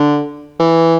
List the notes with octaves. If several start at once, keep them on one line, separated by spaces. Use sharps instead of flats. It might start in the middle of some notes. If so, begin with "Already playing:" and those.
Already playing: D3
E3